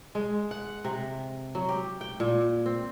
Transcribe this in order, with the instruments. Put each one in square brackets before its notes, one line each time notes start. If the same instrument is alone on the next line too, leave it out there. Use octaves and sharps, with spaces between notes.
[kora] G#3
F#5
C3
F#3
G4
G5
A#2
C4